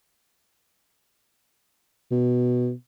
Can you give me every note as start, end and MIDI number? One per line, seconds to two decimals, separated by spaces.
2.11 2.72 47